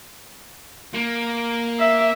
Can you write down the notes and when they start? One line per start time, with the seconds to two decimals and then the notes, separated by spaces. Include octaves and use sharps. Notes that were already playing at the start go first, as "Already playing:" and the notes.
0.95 A#3
1.79 E5